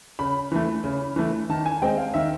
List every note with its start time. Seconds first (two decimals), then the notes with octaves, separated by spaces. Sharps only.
0.19 C#3 B5
0.52 E3 A3
0.84 C#3
1.16 E3 A3
1.49 D#3 A5
1.66 G#5
1.82 G#3 C4 G5
1.98 F5
2.14 D#3 E5